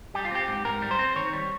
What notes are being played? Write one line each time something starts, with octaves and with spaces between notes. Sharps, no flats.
G3 G4
F4
C4 G4
G#2
G#2 A#4
G3
C5
C4
D#3 C#5
G3